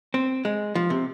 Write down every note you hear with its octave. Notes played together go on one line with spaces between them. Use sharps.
C4
G#3
F3
C3